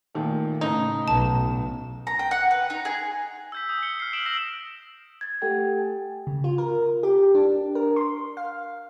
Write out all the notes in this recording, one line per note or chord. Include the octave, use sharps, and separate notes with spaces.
A#2 D#3 A3
A2 C#3 D#4
B1 A5
A#5
G5
F#5
B4
D#4
G#4
E6 G6 B6
D#6 G6
C#7 G7
F6 C7
E6 D7 E7 F#7
E6 F6 A#6 C7 E7 F#7
G#6 A6
A3 G4 A4 F#5 G5
G#5
C#3
F4
A#4
G4
D4
A#4
C6
F5